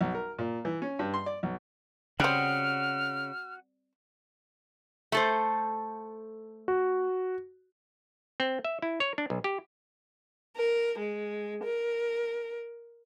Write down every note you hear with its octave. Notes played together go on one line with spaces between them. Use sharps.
B1
A#4
A#2
E3
C#4
G2
C6
D5
B1
C#3 G3 C4 F#4 F#5 D#6 F6
A3 A4 C5
F#4
C4
E5
E4
C#5
D4
B1
G4
A#4
G#3
A#4